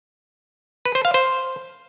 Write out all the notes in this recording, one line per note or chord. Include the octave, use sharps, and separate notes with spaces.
B4
C5
F5
C5